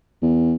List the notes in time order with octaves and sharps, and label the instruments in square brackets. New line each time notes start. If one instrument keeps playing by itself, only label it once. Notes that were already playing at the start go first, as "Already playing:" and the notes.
[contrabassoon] E2